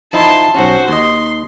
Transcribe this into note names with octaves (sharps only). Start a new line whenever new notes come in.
F3 D#4 E4 A5 C6
B1 C#4 F#4 C5
D#2 D#5 C6